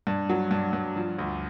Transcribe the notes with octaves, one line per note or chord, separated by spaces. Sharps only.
G2
F#3
G2
G2
F3
D2